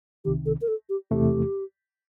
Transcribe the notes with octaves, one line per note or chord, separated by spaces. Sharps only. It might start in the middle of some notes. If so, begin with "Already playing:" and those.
C2 C3 D#3 G4
A4
A#4
A4
G4
E2 C3 E3 A3 G4